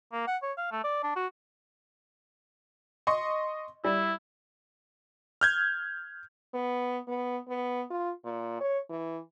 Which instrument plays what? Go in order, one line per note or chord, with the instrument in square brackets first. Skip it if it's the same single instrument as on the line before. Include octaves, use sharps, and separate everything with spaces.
[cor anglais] A#3
F#5
C#5
F5
A3
D5
D4
F#4
[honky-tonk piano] D#5 C6 C#6
[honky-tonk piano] G3 [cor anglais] E4
[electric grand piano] F6 G6 G#6
[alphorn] B3
B3
B3
F4
A#2
C#5
E3